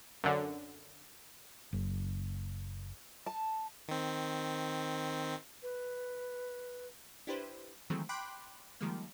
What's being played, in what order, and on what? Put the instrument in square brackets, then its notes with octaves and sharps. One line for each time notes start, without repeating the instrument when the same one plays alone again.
[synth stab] F#2 D3
[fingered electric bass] F#1
[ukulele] A5
[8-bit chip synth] D#3 C4
[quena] B4
[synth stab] D4 E4 G4 B4 C5
D#3 E3 F#3 G#3 A3 C4
G5 B5 C6 D6 F#6
D#3 F3 G3 G#3 A#3